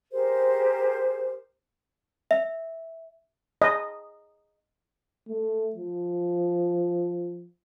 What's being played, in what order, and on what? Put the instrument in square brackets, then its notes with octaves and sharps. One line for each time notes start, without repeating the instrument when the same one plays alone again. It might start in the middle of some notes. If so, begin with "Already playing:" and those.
[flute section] G4 G#4 A#4 C5
[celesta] E5
[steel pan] D#5
[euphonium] A3
F3